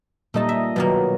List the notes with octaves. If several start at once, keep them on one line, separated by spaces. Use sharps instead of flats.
A#2 G3 A3 D#4 D#5 A5
E5
B2 D#3 F#3 A#3